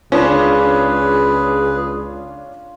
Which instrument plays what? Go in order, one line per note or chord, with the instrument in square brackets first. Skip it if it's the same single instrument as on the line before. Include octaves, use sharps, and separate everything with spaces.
[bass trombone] C#2 [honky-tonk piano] C#4 D4 [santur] F4 A#4 [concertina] G#4 B4